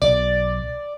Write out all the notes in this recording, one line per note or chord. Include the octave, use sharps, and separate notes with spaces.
B1 D5